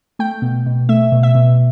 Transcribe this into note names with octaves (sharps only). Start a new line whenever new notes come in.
A3 G5
B2
B2
A3 E5
B2
E5
B2